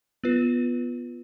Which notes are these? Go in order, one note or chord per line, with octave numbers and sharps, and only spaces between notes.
B3 F4 B4